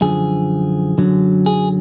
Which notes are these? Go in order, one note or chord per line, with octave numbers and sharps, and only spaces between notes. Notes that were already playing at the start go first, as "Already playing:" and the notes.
F#2 D3 F3 G#4
F#2 D3 F#3
G#4